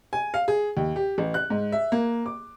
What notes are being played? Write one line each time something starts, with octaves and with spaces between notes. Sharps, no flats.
G#5
F5
G#4
D#2
G4
A1
F#6
G#2
E5
A#3
D6